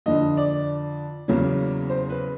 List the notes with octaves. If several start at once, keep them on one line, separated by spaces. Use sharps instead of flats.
F2 D3 F3 D#5
D5
E2 C#3 F#3 A#3 C#4
C5
B4